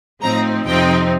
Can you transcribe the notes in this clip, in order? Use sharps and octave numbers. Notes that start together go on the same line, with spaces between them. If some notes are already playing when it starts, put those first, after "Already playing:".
A2 F3 C4 D#4 A#5
F2 C3 F3 C4 D#4 G5